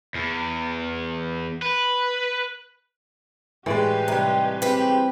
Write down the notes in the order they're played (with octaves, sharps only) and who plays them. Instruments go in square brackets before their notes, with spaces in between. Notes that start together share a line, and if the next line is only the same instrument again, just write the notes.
[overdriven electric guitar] E2
B4
[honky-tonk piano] A2 G#3 [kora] E3 D5 [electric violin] G4 B4
[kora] C3 G3 [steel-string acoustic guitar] D#4
[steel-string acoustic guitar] C4 B4 [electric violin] G4